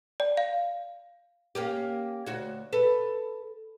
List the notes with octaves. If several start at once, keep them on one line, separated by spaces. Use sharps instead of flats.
D5
F5
A#3 C#4 G4
D2 F#4 C#5
A4 B4